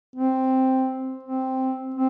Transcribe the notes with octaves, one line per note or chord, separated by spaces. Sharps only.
C4
C4
C4